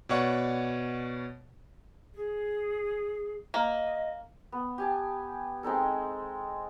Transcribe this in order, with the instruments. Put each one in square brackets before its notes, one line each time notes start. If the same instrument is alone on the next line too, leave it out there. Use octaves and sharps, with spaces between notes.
[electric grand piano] B2 C#5 D5 F#5 C#6
[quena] G#4
[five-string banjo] A#3 [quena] D#5
[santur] B3
G4 G#5 A5
G#3 C4 D#4 A4